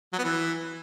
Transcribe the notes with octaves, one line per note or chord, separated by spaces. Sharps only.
F#3
B3
E3